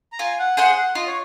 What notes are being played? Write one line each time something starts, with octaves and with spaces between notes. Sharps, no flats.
A#5
F4 G#5
F#5
G#4 C5 F#5
F#5
F4 D#5
C#5